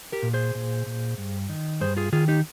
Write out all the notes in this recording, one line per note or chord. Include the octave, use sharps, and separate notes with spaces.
G4 A#4
A#2
G#4 C5
A#2
A#2
G2
D#3
G2 G#4 C5
F4 G#4
D#3 F4 G#4
D#4 G4